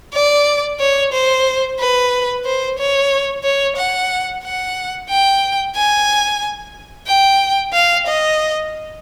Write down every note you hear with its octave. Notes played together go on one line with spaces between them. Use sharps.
D5
C#5
C5
B4
C5
C#5
C#5
F#5
F#5
G5
G#5
G5
F5
D#5